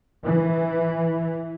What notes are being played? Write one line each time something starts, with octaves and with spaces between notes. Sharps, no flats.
E3